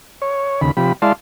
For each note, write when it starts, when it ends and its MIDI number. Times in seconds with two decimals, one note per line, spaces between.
0.22 0.61 73
0.61 0.71 39
0.61 0.71 49
0.61 0.71 83
0.77 0.92 48
0.77 0.92 53
0.77 0.92 67
0.77 0.92 83
1.02 1.12 56
1.02 1.12 64
1.02 1.12 74
1.02 1.12 77
1.02 1.12 81
1.02 1.12 84